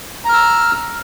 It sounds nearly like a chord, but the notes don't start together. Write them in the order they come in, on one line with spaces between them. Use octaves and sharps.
A#5 F6 E6